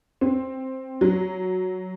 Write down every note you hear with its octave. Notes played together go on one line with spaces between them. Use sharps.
C4
F#3